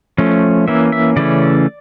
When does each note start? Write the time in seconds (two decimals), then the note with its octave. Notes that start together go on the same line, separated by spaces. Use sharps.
0.18 F3 A3 C#4
0.68 E3 A#3 C#4 E5
0.92 E5
1.16 C#3 E3 A3 C#4 D5